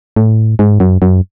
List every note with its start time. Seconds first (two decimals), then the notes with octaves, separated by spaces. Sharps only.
0.16 A2
0.59 G#2
0.80 F#2
1.02 F#2